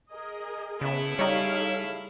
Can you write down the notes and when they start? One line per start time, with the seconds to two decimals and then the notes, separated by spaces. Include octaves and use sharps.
0.10 G#4 A#4 D#5
0.81 C#3 A3 B3 E4
1.19 G3 D#4 G#4 A4 C#5 F5